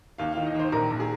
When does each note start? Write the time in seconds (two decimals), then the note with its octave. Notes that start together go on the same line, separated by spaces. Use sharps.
0.18 D#2 F5
0.32 D#3 F5
0.46 D#5
0.54 D#3 C5
0.72 A#1 A#4
0.90 A#1
1.00 G#4